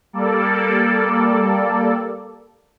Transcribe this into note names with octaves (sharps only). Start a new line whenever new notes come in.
G3 A#3 A4 D5